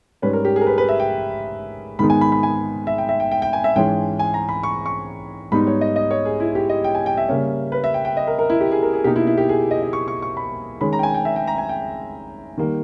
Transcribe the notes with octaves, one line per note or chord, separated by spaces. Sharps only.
G#2 G3 C#4 B4
A#4
G4
G#4
A#4
B4
B4
E5
G5
G#2 D#3 G#3 B3 D#4 B5
G#5
B5
B5
G#5
E5
G5
E5
G5
G5
G5
G#5
E5
G#2 E3 G#3 C#4 G5
G#5
A#5
B5
C#6
C#6
G#2 G3 B3 D#4 B5
C#5
D#5
D#5
C#5
G#4
E4
G4
D#5
G5
G#5
G5
E5
C#3 G3 A#3 C#4
B4
E5
G5
G5
D#5
A#4
A#4
E4
G4
G#4
A#4
G#4
B2 A#3 D#4 G4
E4
E4
G4
G#4
D#5
D#5
C#6
C#6
C#6
B5
D#3 G#3 C#4 B5
A#5
G5
G#5
G5
E5
G5
A#5
G#5
G5
D#3 G3 A#3